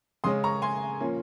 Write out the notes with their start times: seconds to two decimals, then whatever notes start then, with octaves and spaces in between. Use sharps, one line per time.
0.24 C#3 G#3 C#4 C6 D#6
0.44 A#5 C#6
0.62 G#5 C6
1.01 A#2 F3 A#3 C#4